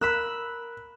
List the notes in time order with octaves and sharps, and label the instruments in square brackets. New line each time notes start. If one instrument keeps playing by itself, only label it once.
[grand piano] A#4 [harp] B5 E6 F#6